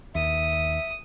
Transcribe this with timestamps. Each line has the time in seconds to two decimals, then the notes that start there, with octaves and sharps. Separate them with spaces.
0.15 D#2 E5 D#6